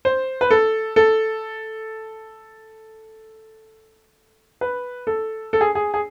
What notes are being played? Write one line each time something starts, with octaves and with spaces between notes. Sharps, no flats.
C5
B4
A4
A4
B4
A4
A4
G#4
G#4
G#4